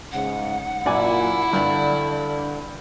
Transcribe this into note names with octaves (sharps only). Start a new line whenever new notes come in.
G#2 C#3 F#5
F#2 A#2 E4 D5 G#5
G2 D3 D5